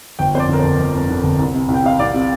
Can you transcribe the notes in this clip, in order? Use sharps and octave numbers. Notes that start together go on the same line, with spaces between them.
G1 G5
F2 C5
D5
D3 A#4
G1 C5
G1
F2
D3
G1
C2
C3
C2
G5
C3 F5
C2 D5
C3